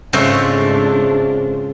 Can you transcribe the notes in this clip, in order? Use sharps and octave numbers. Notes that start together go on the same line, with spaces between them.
G#2 C#3 G#3 A3 C4 D4 F4